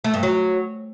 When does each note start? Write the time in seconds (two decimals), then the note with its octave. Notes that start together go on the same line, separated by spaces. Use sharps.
0.04 A3
0.14 G2
0.23 F#3